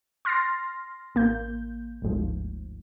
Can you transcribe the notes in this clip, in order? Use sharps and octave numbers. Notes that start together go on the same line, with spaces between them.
C6 F6 A6 A#6 C7
A1 A#3 G6
G1 D2 G#2 F3